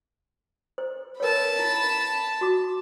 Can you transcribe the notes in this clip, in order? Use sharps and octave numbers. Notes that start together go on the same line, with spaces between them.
C5
A#4 B4 C#5 A5 B5
E4
F#4 D6